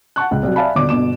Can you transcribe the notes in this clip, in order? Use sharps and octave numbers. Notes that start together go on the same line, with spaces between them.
F#5 A5 C#6 F#6
C#2
C2 F#3
D5 E5 F5 G#5 A5 B5
D#1 B2 D3 D5 D6
G1 B2 D6 E7